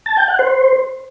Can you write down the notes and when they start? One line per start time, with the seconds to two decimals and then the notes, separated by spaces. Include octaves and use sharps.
0.06 A5
0.17 G5
0.28 F#5
0.39 C5